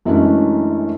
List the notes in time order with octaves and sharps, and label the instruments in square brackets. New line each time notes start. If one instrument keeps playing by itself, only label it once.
[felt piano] F#2 E3 G#3 A3 C#4 D4